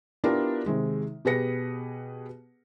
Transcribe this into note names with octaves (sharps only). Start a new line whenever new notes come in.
B3 D4 E4 F4 G4 A#4
C3 D#3 G#3
B2 G4 G#4 B4 A#6 C#7